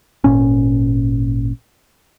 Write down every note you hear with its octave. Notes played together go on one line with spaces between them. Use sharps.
G#1 A#2 C#4